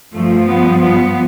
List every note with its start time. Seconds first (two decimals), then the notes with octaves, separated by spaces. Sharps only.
0.14 G2 F3 A3
0.48 B3
0.82 B3